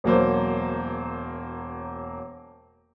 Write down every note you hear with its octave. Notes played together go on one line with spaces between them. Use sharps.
E1 F#3 A#3 C5